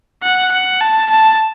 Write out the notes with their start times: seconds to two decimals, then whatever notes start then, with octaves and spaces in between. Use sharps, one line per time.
0.23 F#5
0.52 F#5
0.81 A5
1.10 A5